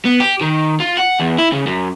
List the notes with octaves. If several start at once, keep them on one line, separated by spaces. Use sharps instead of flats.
B3
G4
D#3
F4
F#5
E2
E4
C#3
F#2